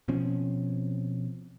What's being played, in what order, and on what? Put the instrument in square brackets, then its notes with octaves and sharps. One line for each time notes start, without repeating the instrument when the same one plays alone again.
[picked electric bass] B2 F3 C4 C#4